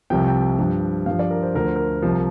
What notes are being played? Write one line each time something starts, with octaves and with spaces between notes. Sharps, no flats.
C2 C3 F3 G5
G5
G2 F3
G2 F3 F5
D5
A#4
C5
D2 D3 F3 A#4
C5
A#4
C2 C3 F3